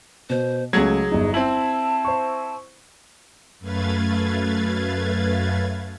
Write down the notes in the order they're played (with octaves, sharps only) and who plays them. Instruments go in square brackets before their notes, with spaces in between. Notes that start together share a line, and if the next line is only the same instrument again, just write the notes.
[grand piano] B2 [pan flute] C5
[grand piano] C#2 A3 [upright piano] F#3 G#6 [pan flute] G#4
[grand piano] G1 D#4
[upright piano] C4 E4 [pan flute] A5 [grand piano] F#7
[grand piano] C5 C#6
[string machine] F#2 A3 B4 F5 G#6 A6